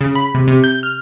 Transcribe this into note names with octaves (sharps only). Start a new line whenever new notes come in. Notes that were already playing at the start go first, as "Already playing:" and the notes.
C#3
B5
C3
C3
G6
F6